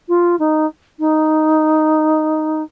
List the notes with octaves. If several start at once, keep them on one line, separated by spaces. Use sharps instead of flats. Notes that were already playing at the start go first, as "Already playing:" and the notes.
F4
D#4
D#4